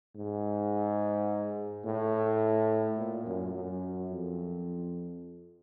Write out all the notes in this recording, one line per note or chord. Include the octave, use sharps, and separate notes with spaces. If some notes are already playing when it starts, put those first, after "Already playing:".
G#2
A2
A#2
F#2
F#2
F2